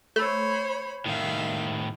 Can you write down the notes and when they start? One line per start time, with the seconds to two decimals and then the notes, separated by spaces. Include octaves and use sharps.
0.16 A3 C5 C#5 B5
1.06 A2 D#3 E5 F5